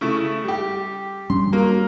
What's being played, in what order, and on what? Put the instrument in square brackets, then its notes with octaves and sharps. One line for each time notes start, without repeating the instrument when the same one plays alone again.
[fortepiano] C#3 A3 E4
G3 G4
[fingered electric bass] G3 C#4 D4 [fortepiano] C6
[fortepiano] F#3 A#3